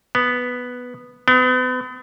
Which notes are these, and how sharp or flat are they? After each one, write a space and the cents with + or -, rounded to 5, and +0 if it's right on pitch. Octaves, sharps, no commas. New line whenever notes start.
B3 +0
B3 +40